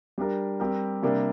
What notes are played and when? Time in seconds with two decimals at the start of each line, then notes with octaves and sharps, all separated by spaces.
0.18 G3 D4 G4 A#4
0.60 G3 C4 G4 A#4
1.03 C3 G3 A#3 D4